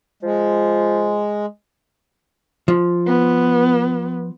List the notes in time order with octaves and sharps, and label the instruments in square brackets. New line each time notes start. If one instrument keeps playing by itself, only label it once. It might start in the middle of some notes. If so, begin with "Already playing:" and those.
[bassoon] F3 [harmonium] G#3
[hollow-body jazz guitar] F3
[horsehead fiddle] B3